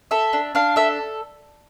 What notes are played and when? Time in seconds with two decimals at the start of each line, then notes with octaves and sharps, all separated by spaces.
0.11 A4 E5
0.33 D4
0.55 D4 F5
0.76 A4 E5